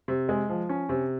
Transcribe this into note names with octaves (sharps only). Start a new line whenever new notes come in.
C3
G#3
F3
C#4
C3